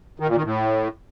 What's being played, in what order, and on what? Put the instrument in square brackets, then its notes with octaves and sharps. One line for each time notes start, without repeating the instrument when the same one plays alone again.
[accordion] D#3
A#2
D#3
A2